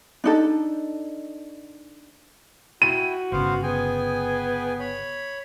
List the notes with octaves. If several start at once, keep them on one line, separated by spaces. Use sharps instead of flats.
D4 D#4 A4
E4 F#4 G5 D#7
G1 C#3 B3 C5 F5
B3 G#4 G5 G#5
C#5 B5